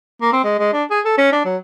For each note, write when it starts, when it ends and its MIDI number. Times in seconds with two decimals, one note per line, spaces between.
0.21 0.32 58
0.33 0.40 60
0.44 0.56 56
0.59 0.68 56
0.73 0.84 62
0.90 1.00 68
1.05 1.16 69
1.18 1.31 61
1.32 1.41 62
1.45 1.57 54